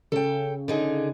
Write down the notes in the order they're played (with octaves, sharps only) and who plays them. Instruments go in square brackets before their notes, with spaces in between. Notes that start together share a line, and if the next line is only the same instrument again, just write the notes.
[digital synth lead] C#3 [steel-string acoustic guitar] A4 G5
[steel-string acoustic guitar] D3 D#4 G#4